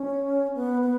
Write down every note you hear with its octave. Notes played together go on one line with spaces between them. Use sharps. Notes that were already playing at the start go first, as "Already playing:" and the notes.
Already playing: C#4
B3
B3